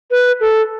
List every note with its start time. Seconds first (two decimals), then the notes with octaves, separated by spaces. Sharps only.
0.11 B4
0.40 A4